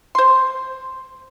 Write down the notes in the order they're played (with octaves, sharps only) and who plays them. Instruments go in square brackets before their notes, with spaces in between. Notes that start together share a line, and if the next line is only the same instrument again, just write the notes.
[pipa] C5 C6